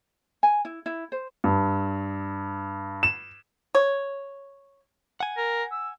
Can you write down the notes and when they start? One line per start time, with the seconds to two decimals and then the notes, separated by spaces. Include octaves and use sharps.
0.43 G#5
0.65 E4
0.86 E4
1.12 C5
1.44 G2
3.03 E7
3.75 C#5
5.20 F#5 G#5
5.37 A#4
5.72 E6